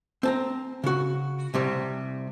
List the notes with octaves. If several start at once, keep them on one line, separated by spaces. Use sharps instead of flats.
C4 A5 A#5
C#3 F#4
C2 C3 G3